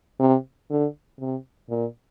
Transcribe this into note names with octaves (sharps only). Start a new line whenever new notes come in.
C3
D3
C3
A#2